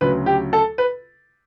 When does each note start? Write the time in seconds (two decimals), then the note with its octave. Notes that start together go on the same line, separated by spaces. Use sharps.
0.01 D2 C#3 F#3 B4
0.26 G4
0.53 A4
0.78 B4